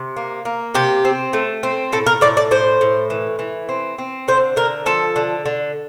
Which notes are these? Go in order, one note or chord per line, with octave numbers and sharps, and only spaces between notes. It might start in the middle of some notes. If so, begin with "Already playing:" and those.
Already playing: C3
A#3
A#3
C3 G4
C4
A3
C4
A2 A4
A#4
A2 D5
D5
A2 C5
A2
E3
E3
C4
C4
D3 C5
D3 A#4
F3 A4
D3
D3